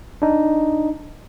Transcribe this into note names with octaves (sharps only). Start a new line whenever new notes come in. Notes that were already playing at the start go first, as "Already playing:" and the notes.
D4 D#4